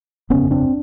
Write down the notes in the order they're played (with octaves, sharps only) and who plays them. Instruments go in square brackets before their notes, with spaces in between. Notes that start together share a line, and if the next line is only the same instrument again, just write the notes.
[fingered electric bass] G1 F2 C#3 B3 C#4
C4 D4